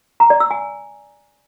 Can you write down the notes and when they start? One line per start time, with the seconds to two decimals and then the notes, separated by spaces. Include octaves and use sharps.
0.20 A#5
0.30 D5
0.40 E6
0.51 G#5